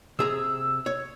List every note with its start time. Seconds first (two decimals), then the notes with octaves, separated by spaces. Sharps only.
0.19 C3 G#4 A#5 E6
0.86 C#5